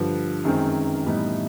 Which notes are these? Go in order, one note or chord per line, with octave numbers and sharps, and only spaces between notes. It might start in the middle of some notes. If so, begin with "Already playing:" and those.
Already playing: G2 D3 F3
F#2 D#3 G#3 C4
A2 E3 G3 B3 D#4